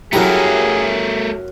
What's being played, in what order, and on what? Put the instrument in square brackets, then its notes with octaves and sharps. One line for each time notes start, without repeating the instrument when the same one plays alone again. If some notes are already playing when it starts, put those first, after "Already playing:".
[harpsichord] F#2 A#5 [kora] F#3 E4 G4 [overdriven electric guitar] A3 A#4 [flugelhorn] G#4